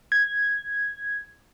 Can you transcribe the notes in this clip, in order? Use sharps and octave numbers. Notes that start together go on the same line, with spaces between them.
G#6